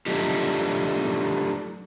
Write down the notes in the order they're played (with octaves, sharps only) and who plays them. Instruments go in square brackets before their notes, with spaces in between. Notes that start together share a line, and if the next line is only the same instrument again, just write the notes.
[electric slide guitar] F#3 A3 D4 D#4 F4 G4